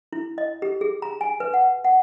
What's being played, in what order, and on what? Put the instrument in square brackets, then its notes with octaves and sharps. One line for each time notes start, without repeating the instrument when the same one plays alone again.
[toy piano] E4
D#5
G4
G#4
A#5
G#5
B4
F#5
F#5